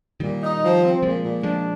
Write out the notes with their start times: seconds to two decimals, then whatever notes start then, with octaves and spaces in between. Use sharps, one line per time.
0.20 A#2 D#3 G3
0.42 D#4
0.62 F3
0.82 C4
1.03 A#2 F3 G#3
1.23 A#2
1.43 F3 G#3 D4